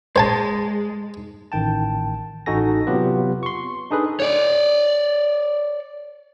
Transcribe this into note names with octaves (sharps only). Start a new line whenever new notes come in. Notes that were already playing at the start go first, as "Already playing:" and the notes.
G#3 C5 G#5 A5
A1 D#3 G5 A5
A1 D#4 F#4 A4 G#5 A#6
C3 F#3 B3 F4 G4 B4
C6 C#6
D4 D#4 G#4 A4 B4
C#5 D5